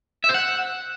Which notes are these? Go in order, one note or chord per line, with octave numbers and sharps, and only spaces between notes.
E5
C5
F#5